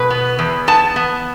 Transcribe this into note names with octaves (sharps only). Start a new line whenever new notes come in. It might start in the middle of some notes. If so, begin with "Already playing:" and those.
Already playing: B2 B4
B3
E2
B3 A5
B3